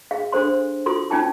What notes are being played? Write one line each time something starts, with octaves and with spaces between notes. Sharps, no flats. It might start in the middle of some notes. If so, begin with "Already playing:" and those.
G#4 F5
D4 A4 C5 C6
F4 F#4 A4 C6
C#4 D#4 F4 G#5 A5 D6